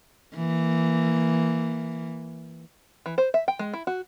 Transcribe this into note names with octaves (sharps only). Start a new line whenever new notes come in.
E3 A#3
E3
C5
E5
G5
G#3
E4
F#4